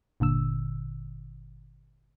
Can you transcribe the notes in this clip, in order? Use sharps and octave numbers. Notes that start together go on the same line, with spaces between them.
G1 A#2 D3 E6